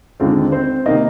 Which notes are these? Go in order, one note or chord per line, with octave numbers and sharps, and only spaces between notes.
D#2 D3 G#3 C4 F4
C4 C5
C3 D#3 A#3 D#4 D#5